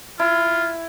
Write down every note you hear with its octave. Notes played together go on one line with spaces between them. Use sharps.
E4 F4